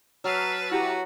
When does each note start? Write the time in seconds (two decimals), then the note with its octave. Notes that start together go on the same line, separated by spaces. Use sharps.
0.24 F#3 B4 A5 E6 F6 C7
0.72 E4 F#4 G4 A#5